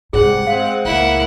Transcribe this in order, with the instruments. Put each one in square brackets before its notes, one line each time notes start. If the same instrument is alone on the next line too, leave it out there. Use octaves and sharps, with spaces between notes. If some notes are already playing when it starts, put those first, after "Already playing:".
[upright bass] G#2 [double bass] C3 G3 [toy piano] G#4 [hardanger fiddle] F#5
[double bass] G#3 C4 [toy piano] F5
[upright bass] C#2 [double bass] A2 A#3 [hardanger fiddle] E4 F#5